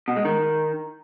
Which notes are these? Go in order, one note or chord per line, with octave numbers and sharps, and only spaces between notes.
B2
G#3
D#3